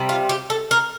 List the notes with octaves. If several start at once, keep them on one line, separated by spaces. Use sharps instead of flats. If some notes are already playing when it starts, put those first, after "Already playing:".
Already playing: C3 G3
F4
G4
A4
A#4